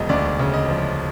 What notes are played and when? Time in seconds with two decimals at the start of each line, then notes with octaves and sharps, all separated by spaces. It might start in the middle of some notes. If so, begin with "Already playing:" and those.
Already playing: E1 C#3 F3 D#5
0.09 D2 D5
0.39 C#3
0.54 D#5
0.68 F3